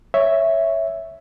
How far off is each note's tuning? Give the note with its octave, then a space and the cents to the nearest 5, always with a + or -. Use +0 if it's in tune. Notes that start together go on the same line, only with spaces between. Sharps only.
C#5 +0 E5 +0